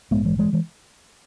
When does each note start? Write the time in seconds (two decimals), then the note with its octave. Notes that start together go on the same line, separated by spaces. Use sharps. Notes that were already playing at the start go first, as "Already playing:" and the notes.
0.11 A#1 G#2 G#3 B3
0.25 E3 G#3
0.38 E3 G#3
0.53 E3 G#3